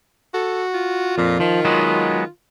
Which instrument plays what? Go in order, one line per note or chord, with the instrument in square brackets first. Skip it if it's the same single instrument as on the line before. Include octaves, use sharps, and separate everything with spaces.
[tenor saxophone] F#4 [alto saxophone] A4
[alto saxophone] F4
[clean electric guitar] F2 [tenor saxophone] A#2
[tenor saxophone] D#3 [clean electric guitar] F3
[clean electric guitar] F#3 G#3 B3